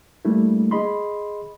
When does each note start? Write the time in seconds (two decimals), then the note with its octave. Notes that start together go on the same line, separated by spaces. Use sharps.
0.25 G3 A3 A#3 D4 E4
0.71 G#4 D#5 B5 C6